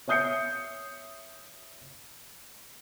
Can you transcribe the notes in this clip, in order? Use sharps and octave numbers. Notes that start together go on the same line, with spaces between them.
C#5 E5 D#6 G6 C7 C#7